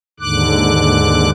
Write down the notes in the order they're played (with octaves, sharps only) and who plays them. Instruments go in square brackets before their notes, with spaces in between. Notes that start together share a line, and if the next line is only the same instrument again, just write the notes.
[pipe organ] D#2 G#2 D3 D6 F#6